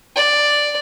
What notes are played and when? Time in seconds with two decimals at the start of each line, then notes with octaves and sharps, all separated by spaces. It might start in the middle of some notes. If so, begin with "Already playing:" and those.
0.16 D5